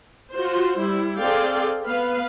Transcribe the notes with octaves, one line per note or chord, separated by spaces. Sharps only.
F4 F#4 C5
G3 E4
C4 G#4 A4 D5 F5 G5
B3 B4 F5